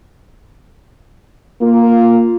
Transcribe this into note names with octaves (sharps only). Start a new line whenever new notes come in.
A#3 F4